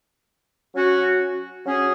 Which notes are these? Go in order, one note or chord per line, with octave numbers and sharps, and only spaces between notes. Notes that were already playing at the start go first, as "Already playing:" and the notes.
F#3 C#4 F#4
F#3 C#4 G#4